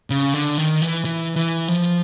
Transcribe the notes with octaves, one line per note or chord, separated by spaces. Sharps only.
C#3
D3
D#3
E3
E3
E3
F3